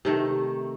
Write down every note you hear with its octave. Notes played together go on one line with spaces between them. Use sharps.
C3 D#3 A3